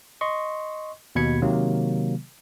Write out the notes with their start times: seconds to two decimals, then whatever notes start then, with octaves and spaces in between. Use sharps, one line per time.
0.21 D#5 C6 C#6
1.15 D#2 B2 B5 G#6 C#7
1.42 C3 D#3 F#3 A#3